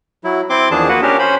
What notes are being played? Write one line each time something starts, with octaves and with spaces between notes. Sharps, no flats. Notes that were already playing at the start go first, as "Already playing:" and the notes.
F#3 E4
C4 E4 C6 D6
E2 D#3 F3 D4 G#4 A5
A#3 F#4 B4 F#5
C#4 D4 G4 A#4
C#4 C5 B5